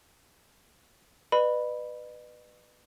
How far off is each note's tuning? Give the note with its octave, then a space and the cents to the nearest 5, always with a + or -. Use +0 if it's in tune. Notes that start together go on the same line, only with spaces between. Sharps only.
B4 +0 D#5 -45 B5 +0